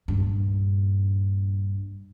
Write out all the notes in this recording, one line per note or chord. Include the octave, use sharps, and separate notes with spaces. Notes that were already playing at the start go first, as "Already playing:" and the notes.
A#1 G2